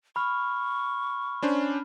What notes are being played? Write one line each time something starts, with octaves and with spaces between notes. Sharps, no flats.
B5 C#6 F6
C#4 D4 C5